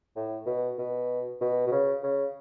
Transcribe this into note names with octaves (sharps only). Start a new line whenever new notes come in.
A2
B2
B2
B2
B2
C#3
C#3